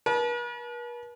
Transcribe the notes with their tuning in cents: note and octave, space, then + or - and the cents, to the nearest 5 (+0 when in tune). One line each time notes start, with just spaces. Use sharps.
B4 -45 A5 -30